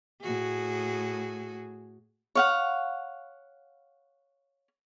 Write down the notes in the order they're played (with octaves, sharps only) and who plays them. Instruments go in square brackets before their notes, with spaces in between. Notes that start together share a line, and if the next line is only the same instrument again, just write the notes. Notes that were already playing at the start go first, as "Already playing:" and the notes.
[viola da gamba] A2 F#4 G#4
[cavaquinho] C#5 F5 F#5